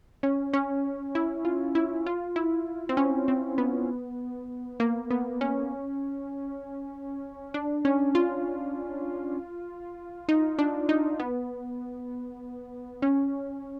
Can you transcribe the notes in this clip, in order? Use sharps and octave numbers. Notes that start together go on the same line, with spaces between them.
C#4
C#4
E4
F4
E4
F4
E4
C4
C#4
C4
B3
A#3
B3
C#4
D4
C#4
F4
D#4
D4
D#4
B3
C#4